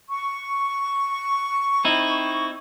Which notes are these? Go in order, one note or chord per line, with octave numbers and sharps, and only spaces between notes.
C#6
C4 D#4 E4